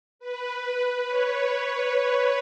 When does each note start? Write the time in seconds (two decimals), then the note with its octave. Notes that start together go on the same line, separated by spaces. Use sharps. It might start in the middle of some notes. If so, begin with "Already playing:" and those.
0.19 B4
0.49 B4
0.78 B4
1.07 C#5